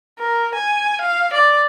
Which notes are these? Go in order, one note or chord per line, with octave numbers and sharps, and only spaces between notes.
A#4
G#5
F5
D5